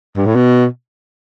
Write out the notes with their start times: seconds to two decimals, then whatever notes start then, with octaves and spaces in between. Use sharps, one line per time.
0.17 G2
0.26 A2
0.35 B2